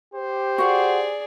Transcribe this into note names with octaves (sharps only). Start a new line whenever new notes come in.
G4 C5
F#4 G#4 D5 F#5